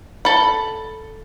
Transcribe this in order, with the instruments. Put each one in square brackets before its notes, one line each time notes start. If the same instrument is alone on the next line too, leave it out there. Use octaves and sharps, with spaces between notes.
[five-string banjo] A4 B5